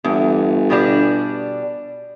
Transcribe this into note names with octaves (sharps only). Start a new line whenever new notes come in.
G1 E2
B2 G3 D4